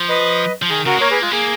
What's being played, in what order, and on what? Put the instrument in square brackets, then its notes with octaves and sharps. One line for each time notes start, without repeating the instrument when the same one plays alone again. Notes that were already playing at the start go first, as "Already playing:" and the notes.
Already playing: [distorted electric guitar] F3
[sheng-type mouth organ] B4 D#5
[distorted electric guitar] F3
[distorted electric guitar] D#3 [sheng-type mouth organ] G#4
[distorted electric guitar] C#3 [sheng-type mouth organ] F#4 A#4
[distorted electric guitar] G#3
[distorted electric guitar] A#3 [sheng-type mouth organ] A#4 C#5
[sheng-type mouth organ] G#4 B4
[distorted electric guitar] G#3 [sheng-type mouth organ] F4
[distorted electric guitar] A#3 [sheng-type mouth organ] G#4